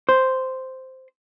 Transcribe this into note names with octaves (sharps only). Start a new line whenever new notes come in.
C5